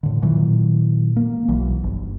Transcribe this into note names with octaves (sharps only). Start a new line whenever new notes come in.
A2 D3
A#2 D#3 E3 F#3
A#3
B1 E3 F#3
G1